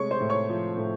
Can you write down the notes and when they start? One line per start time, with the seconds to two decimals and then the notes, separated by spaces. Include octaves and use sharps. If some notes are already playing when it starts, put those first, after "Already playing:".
Already playing: C3 G#3 A3 C#5 C#6
0.11 C5 C6
0.21 A2
0.30 C#5 C#6
0.49 F3
0.77 A2